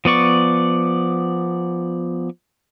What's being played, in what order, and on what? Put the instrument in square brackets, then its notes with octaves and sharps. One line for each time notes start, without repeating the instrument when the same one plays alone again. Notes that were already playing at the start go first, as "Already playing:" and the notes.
[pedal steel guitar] F3 B3 D5 C#6